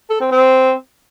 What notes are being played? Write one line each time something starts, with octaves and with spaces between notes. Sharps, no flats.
A4
C4
C4